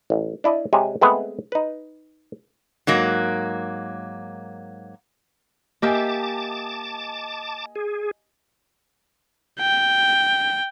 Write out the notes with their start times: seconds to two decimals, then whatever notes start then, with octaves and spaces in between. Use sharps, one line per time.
0.10 A1
0.44 D4 E4 D5 D#5
0.73 C3 G#3 G4 C#5 G#5
1.01 G#3 A3 B3 C4 G#4 B4
1.52 D#4 B4
2.87 G#2 F#3 A#3
5.82 A#3 G4 D#5 E5 G#5 A5 D6
7.76 G#4
9.60 G5